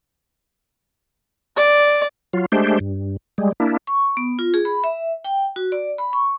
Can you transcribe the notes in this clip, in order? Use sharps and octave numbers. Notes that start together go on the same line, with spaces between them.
D5
F#3 F4
G#3 A3 D4 G4 C5
G2
G3 G#3
A#3 D4 E4
C#6
B3
F4
G#4
B5
E5
G5
F#4
D5
B5
C#6